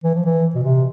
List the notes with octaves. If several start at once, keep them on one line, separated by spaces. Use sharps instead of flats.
E3
F3
E3
B2
C3